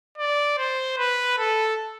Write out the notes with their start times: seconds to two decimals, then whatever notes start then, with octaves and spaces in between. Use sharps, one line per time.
0.18 D5
0.58 C5
0.98 B4
1.39 A4